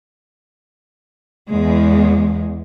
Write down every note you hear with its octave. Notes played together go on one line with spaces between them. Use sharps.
E2 G#3